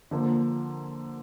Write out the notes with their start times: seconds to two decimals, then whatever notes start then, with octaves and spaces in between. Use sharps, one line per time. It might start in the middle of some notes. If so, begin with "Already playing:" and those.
0.11 D3 F3 A#3